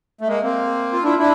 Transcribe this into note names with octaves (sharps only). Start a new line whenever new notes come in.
A3
G#3 A#3
A#3 C4
F4
D4 E4
D4 E4